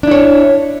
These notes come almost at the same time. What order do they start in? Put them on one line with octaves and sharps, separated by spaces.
D4 E4 C#5